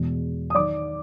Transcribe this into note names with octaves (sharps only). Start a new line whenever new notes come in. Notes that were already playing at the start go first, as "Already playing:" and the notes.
Already playing: E2 B2 G#3
D#6
D#3 D5 D6